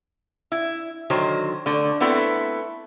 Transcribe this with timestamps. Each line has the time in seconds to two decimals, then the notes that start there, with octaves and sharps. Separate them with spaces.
0.52 E4
1.10 D3 D#3 F#3 C5
1.66 D3 A3
2.00 A3 B3 C4 E4 A4